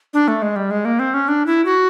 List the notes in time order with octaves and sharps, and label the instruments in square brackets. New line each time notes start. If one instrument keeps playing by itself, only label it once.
[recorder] D4
A3
G#3
G3
G#3
A#3
C4
C#4
D4
E4
F#4